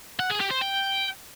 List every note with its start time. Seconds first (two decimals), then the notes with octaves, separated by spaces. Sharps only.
0.20 F#5
0.30 G#4
0.41 G4
0.51 C5
0.62 G5